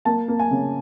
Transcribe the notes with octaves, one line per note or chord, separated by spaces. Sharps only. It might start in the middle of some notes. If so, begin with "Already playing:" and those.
A#3 A5
A#3
G#5
C#3